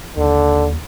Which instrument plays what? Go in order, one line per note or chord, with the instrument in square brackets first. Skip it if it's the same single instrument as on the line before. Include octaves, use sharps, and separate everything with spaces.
[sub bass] D#2 [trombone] D3